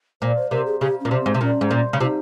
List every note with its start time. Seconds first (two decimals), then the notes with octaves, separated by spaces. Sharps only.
0.21 A#2 C5
0.36 C5
0.51 C3 A#4
0.66 G#4
0.81 C#3 G4
1.01 A#2 C#4
1.11 C3
1.21 C4
1.26 G#2
1.34 C3
1.41 A#2 C#4
1.61 G#2
1.71 A#2
1.93 C#3
2.00 C3 F4
2.05 D#4